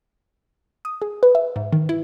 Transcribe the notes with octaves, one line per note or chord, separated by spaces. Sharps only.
D#6
G#4
B4
E5
G#2
D#3
E4